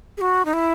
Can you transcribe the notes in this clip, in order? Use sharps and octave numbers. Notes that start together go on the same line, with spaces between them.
G#4
F#4
D#4
E4